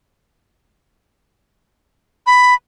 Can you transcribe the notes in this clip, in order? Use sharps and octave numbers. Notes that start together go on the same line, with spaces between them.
B5